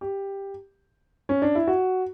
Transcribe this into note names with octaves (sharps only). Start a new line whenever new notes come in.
G4
C#4
D4
E4
F#4